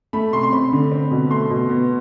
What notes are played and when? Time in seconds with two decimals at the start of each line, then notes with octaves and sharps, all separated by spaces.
0.13 A3 B5
0.33 C3 C6
0.43 C6
0.52 C4 B5
0.72 D3
0.91 C4
1.11 B2
1.30 A3 C6
1.50 B2
1.69 B3